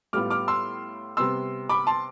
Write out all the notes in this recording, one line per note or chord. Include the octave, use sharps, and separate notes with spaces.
A2 G3 B3 F4 D6 F6
D6 F6
C6 E6
C3 G3 B3 C6 E6
B5 D6
A5 C6